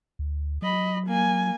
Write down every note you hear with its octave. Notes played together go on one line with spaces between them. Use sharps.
D2
F#3 D#5 B5
A#3 G#5